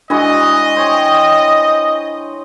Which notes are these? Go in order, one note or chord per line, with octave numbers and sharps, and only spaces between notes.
E3 G#3 D4 F#4 D#5
C5 C#5 G5